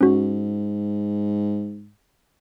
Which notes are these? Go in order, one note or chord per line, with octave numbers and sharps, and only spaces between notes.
G#2 C#4 F#4